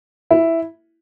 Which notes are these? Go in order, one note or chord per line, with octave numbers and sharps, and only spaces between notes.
E4